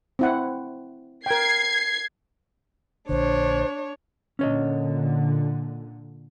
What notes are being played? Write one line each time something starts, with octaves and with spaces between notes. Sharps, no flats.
C4 E4 F#5
A#4 G5 G#6 C7
A#1 D3 D4 C5 C#5
A#2 D3 C#4 C#5 D#5